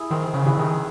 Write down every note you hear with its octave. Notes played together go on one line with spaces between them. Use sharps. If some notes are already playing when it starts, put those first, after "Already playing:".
Already playing: E4 G#4
D#3 C4
C#3
E4 G#4 B4
D#3